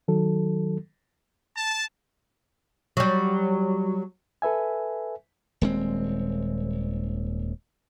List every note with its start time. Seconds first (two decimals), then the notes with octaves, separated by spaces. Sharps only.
0.08 D#3 F#3 A4
1.55 A5
2.97 F#3 G3
4.42 A4 B4 E5 G#5
5.61 D#1 G#3 C4